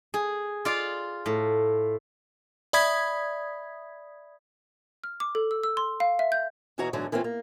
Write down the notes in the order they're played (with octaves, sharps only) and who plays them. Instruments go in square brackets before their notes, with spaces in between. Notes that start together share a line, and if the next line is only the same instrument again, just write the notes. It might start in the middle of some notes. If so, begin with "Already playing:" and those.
[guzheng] G#4
F4 D5 F5
A2
[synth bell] D5 E5 B5 D#6 G#6 B6
[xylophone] F6
D6
A4
E6
E6
C6
F5
E5
G6
[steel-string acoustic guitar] E2 B2 E3 F#4 C#5 A#5
G#2 D3 E3 F#3 A3
E3 A#3 C4 C#4 E4 F4
A#3